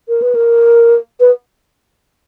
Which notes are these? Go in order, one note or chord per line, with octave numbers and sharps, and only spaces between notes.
A#4
B4
A#4
B4